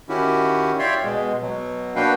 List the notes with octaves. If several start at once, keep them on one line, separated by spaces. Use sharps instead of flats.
D#3 C#4 E4 F#4 G4
C#5 D5 E5 F5 G5 C6
B2 G#3
B2 F#3
A#3 D4 F#4 B4 F5 G5